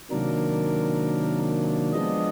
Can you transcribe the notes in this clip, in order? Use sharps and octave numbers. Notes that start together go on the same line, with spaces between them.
C3 D#3 F#3 A#3 D4 A#4
F3 G#3 B3 D4 D#5